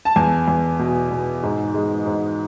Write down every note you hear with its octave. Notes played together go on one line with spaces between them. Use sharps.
A5
E2 G#5
E2
B2
B2
G#2
G#3
G#2